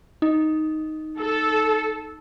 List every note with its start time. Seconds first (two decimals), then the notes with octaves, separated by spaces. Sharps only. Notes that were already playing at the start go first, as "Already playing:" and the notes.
0.22 D#4
1.19 A4